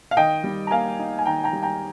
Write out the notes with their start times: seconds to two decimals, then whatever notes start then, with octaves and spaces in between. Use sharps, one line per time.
0.11 F5
0.17 D#3 D#5 G5
0.44 G3
0.67 A#5
0.71 A#3 F5 G#5
0.99 D#4
1.18 G#5
1.26 D#3 G5 A#5
1.44 G5 A#5
1.53 G3
1.63 G5 A#5